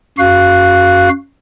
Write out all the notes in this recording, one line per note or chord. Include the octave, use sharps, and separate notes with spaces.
F#2 F#4 F5 F#6